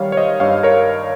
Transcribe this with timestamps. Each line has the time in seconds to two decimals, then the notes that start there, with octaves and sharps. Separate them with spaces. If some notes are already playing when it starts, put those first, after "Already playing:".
Already playing: D#3 G3 C#5 F5
0.12 C#5
0.17 C5 D#5
0.40 G2 C#5 F5
0.63 A#4 C#5